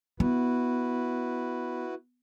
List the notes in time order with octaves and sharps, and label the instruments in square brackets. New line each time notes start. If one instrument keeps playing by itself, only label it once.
[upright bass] B3 [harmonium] E4 F#4 B4